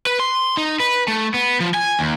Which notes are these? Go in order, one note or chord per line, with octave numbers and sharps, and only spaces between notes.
B4
C6
D#4
B4
A3
B3
F3
G#5
D#2